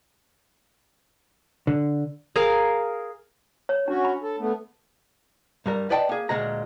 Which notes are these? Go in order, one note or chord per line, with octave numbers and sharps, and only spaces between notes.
D3
G#4 A#4 F5
C#5
C#4 D4 F#4
B5
A4
A3 B3
G2 G3 A#4
B4 D5 D#5 G5 A5
A#3 G#4
D2 A#2 G#3 A#5